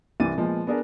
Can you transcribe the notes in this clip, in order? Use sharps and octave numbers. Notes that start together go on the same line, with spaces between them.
C2 C3 E3 A6 D#7
A#2 F3 G#3 B3
B3 D4 G#4 A#4 B4